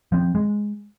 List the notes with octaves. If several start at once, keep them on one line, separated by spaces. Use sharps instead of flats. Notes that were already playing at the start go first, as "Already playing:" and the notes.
F3 C4
G#3